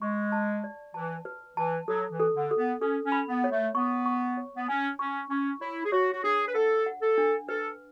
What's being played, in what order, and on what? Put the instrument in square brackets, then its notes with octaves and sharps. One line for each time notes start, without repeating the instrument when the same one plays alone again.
[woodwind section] G#3 [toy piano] C#6
[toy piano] A5
D5
[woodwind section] E3 [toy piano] A5
[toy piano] B4
[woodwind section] E3 [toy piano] A5
[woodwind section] F#3 [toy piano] A4
[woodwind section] E3
[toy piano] A4
[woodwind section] D3
[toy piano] A4
[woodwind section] B3
[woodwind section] C#4 [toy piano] A4
[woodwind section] C#4
[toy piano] B5
[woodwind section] B3
[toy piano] C#5
[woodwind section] A3
[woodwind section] B3 [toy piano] C#6
[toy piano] C#6
C#5
[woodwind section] B3
[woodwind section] C#4 [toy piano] G#5
[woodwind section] C#4 [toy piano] C#6
[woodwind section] C#4 [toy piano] C#6
[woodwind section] E4 [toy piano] C#5
[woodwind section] G#4
[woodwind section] F#4 [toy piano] C#5
[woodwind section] F#4
[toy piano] D4 [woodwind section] G#4
[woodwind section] B4
[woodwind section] A4 [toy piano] F#5
[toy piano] F#5
[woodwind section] A4
[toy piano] D4
[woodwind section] A4 [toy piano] B4